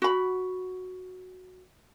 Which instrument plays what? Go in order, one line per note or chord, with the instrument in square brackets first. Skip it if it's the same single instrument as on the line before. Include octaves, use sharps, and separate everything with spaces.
[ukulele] F#4 B5